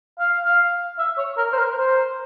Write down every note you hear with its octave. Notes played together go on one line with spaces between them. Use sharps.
F5
F5
E5
C#5
A#4
C5
A#4
C5